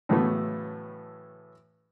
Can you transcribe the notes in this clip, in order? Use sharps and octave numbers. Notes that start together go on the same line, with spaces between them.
A2 C#3 E3 F#3 A3 B3